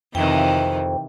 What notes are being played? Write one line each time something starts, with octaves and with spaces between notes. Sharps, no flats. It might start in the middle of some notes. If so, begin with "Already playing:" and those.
F2 C3 D#3 E3 G5